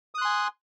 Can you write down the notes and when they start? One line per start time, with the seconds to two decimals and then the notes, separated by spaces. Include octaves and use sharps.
0.15 D#6
0.18 F#6
0.21 C6
0.25 G#5